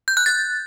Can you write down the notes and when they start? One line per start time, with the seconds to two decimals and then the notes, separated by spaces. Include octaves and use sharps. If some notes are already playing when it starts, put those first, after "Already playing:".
0.08 G6
0.17 F#6
0.26 A6